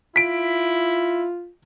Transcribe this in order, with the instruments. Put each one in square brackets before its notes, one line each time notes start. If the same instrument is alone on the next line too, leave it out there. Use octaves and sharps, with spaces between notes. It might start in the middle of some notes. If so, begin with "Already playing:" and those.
[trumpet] E4 [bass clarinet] F4 [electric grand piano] B6 D7